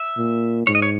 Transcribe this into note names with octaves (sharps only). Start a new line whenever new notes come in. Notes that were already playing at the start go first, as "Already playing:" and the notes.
Already playing: E5
A#2
G#2 C#5
D#5
C#5